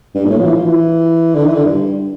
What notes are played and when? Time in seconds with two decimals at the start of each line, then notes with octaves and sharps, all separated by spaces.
0.15 G2
0.25 A#2
0.30 A2
0.39 F3
0.45 E3
0.55 F3
0.64 E3
1.35 D3
1.45 E3
1.55 D3
1.65 G2